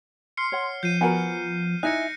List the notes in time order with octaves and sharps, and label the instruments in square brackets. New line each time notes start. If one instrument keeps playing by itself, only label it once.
[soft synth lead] C6 [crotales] F6 C7 C#7
[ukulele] C#5 F#5
[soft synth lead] F3 [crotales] G6 C7 D#7
[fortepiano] B3 F#4 A#4 [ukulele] G#5 A#5
[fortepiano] D#4 [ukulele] E4 E5 G#5 [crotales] F#6 A#6 C#7